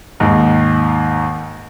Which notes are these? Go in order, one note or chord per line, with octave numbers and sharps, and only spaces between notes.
D#2 G#2